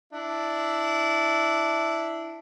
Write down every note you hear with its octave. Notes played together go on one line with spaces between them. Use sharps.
D4 E4